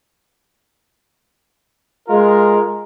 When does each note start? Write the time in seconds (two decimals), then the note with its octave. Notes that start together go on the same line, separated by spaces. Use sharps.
2.09 G#3 F4 A#4